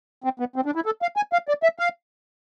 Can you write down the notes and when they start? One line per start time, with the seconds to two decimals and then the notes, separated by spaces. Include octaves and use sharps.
0.24 C4
0.40 B3
0.56 C4
0.66 D4
0.75 E4
0.86 A4
1.02 F5
1.16 G#5
1.33 F5
1.48 D5
1.63 E5
1.79 F5